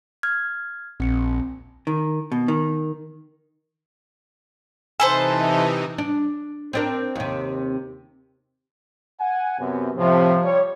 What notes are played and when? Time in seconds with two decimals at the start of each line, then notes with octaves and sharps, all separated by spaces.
0.23 F6 G#6
1.00 A#1 C4 C#7
1.87 D#3
2.32 B2
2.48 D#3
5.00 C3 E3 D#4 A4 B4 C5 G#5
5.98 D4
6.73 C4 D4 A#4
7.15 D#2 C3
9.20 F#5 G#5
9.58 F#2 C3 B3
9.96 A2 C3 F3
10.44 G3 C#5